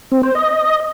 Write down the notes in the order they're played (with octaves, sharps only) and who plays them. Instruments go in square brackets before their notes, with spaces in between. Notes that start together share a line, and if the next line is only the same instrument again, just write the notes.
[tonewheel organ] C4
C5
D#5